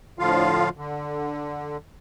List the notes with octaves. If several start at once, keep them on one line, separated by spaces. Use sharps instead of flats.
A2 D3 F3 F4 F5
D3